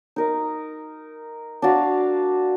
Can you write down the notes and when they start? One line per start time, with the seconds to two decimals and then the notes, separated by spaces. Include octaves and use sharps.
0.16 D#4 A#4 D#5
1.62 D4 F#4 D5 F5